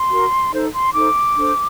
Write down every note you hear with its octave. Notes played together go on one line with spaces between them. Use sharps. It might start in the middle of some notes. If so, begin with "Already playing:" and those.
Already playing: C6
F#4 A#4
D#4 A4 C5
C6
D#4 A4 C5 D6
D4 A4 C5